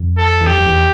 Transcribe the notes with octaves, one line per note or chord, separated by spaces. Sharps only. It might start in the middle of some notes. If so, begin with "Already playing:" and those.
Already playing: F2
A4
E2
F2 G4
F2
E2